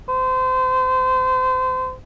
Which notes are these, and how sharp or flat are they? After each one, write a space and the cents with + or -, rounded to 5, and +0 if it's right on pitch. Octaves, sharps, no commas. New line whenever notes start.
C5 -30